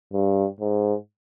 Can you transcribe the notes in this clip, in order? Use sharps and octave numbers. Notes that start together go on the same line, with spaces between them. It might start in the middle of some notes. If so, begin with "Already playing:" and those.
G2
G#2